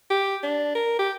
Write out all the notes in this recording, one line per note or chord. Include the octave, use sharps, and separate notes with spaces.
G4
D4
A#4
G4